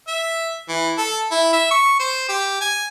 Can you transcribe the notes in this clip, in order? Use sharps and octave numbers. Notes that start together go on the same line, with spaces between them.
E5
E3
A4
E4
E5
C#6
C5
G4
G#5